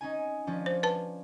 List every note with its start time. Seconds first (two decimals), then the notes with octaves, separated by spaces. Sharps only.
0.01 C#4 D#4 G#5
0.47 F3 C#4 D4
0.66 C5
0.83 B4 A5